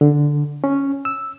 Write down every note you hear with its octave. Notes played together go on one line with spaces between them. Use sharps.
D3
C#4
E6